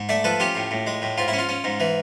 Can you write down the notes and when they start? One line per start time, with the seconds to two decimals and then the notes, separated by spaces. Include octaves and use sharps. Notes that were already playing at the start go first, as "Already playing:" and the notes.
Already playing: G#2
0.09 A3 D5 E5
0.24 F3 A4 B4
0.40 C#4 F4 G4
0.55 A2
0.71 A2
0.87 G#3
1.02 A2
1.18 G#2 F4
1.28 E4
1.33 C#4 F4
1.49 C#4
1.64 G#2
1.80 E3